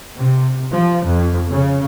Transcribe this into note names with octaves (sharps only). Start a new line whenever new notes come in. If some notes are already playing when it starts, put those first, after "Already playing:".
C3
F3
F2
C#3